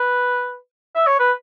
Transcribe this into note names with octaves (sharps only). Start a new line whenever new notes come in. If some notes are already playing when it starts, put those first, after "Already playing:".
Already playing: B4
E5
C#5
B4